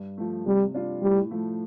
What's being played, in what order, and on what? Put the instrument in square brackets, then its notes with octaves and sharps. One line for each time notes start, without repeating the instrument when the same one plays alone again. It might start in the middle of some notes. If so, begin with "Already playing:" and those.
Already playing: [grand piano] G2
F3 A3
[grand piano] C3 [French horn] G3
[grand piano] G3 D4 F4
[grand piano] A2 [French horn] G3
[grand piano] F3 A3